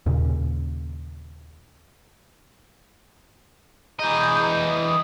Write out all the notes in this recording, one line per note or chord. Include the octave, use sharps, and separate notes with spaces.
D#2 A#2 C#3
E3 G#4 D#5 A#5 G6
D#6